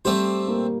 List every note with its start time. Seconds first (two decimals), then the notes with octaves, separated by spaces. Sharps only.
0.05 G3 A3 C4 G4 C5
0.48 A#3